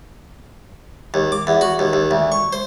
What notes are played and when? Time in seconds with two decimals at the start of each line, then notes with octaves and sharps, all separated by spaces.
1.14 D#2
1.32 D6
1.47 E2
1.61 F#4
1.79 D#2
1.93 D#2
2.11 D2
2.32 C#6
2.53 C5